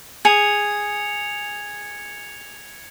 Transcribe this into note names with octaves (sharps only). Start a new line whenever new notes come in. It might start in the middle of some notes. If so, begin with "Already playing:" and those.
G#4 G#6 C#7 F7